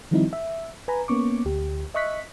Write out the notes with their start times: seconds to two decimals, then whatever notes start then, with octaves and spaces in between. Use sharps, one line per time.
0.11 D#3 F3 G3 C4 D#4 E4
0.33 E5
0.88 B4 G#5 A#5 B5
1.08 A#3 B3 C#4 C#6 D6
1.45 D2 G4
1.94 D#5 E5 C#6 F#6 B6